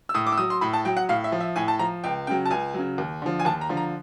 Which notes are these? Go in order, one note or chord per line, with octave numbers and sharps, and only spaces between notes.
E6
A2 D#6
D6
E6
F#3 D#6
C6
A2 B5
A5
F#3 G5
F#5
A2 F5
E5
F3
E5
A2 G#5
A5
F3 A#5
C#2 G5
C#3 F#3 G5
A5
C#2 G#5
C#3 F#3
D#2
D3 F3
G#5
D#2 A5
A#5
D3 F3
A#5